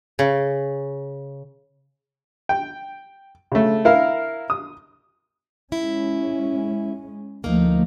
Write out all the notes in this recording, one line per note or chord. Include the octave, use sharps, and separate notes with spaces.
C#3
G5
C#3 A3
E4 A#4 F5
D#6
G#3 C#4 E4
D2 F3 A3 A#3 D#4